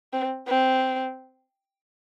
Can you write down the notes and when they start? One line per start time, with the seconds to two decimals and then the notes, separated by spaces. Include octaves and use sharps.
0.13 C4
0.48 C4